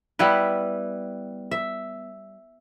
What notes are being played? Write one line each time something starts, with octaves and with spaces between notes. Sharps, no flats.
G3 B3 E4 B4
E5